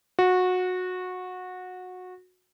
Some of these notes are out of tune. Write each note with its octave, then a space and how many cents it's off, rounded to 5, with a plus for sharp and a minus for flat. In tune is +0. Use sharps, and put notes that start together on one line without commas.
F#4 -20